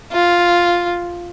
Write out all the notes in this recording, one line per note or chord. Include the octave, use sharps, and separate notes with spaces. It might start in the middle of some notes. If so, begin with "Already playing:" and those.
F4